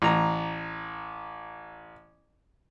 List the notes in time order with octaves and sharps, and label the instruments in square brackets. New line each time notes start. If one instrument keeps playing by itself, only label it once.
[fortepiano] A1 A#5